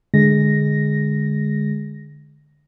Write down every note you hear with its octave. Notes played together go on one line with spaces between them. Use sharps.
D3 G#3 A#6